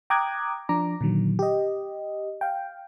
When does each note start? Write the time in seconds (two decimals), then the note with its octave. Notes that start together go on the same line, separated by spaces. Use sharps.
0.10 G5 A#5 D6 D#6 F#6 G#6
0.69 F3 D4 A#5 D6
1.01 A#2 D3 D#3 F#3
1.39 G4 D#5
2.41 F5 G5